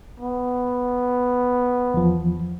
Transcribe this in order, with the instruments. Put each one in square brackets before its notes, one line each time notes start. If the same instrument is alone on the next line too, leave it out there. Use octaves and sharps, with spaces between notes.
[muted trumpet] B3
[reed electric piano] E2 F3